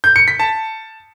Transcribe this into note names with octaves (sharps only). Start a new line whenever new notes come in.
G6
C#7
B6
A5